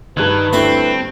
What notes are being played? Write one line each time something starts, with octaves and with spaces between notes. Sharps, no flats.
G2 D#3 B4 F#6 G#6
D2 C4 E4 B5